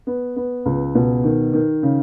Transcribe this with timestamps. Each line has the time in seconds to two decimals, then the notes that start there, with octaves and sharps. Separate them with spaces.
0.07 B3
0.36 B3
0.66 C#2
0.95 B2
1.24 D#3
1.53 D#3
1.83 C#3